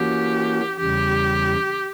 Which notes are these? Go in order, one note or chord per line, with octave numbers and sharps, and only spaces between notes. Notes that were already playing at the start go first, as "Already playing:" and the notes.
Already playing: E3 A#3 C#4 F#4 G4
E2 C#3 G3 G4